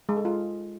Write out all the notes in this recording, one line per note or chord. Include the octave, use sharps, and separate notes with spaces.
G#3
A4
F4